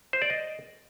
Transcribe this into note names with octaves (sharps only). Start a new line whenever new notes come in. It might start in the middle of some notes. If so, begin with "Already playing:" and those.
C5
D5
D#5